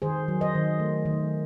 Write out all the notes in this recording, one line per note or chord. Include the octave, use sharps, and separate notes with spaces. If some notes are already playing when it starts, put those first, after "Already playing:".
D#3 G#4 C5
F#3
C5 D#5
D#3
A3
D#3